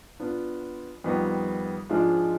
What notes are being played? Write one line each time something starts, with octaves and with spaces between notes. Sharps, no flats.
B3 D4 F4
F2 D#3 G3 B3
G#2 F3 G#3 D4 F4